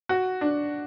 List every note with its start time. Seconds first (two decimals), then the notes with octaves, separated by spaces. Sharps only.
0.09 F#4
0.41 D4